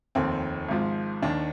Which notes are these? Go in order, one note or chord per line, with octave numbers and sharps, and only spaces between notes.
F1 D#2 D#3 C4
G#1 G#2 F3
D#2 D#3 D4